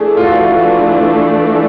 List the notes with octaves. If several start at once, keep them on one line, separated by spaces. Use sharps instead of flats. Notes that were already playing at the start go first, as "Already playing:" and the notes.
Already playing: E3 A3 D4 G#4
F4
F#4